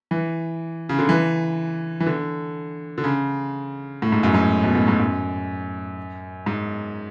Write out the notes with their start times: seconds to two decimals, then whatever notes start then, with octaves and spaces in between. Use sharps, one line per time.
0.11 E3
0.89 C#3
0.99 D3
1.09 E3
2.00 E3
2.06 D3
2.98 D3
3.04 C#3
4.02 A2
4.12 G#2
4.23 F#2
4.34 G#2
4.63 B2
4.75 A2
4.88 G#2
4.99 F#2
6.46 G#2